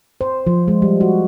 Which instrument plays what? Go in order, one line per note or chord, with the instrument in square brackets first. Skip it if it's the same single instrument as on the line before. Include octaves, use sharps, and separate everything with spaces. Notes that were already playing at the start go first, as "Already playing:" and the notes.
[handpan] C5
F3
G#3
G3
F#4